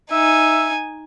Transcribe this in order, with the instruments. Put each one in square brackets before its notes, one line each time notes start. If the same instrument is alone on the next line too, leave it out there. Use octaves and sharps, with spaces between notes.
[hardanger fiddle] D#4 G#5 [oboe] E5